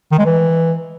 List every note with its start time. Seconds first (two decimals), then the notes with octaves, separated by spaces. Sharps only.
0.12 D#3
0.19 G#3
0.26 E3